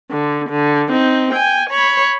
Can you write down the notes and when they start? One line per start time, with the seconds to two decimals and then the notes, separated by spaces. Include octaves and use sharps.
0.11 D3
0.49 D3
0.90 C4 D#4
1.33 G5 G#5
1.70 C#5 B5